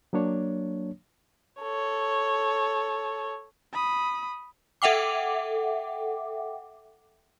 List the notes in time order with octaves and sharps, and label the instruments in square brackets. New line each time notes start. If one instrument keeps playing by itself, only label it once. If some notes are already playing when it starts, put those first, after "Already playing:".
[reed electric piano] F#3 A#3 D4 C#5
[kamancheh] A4 C#5
[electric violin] B5 D#6
[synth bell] A4 E5 F#5 G5 D6